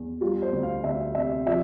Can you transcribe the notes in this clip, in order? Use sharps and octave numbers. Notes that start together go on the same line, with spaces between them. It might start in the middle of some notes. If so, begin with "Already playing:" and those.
Already playing: E2
G3 F4
C5
D2
F5
D2 E5
C3 E5
F3 E5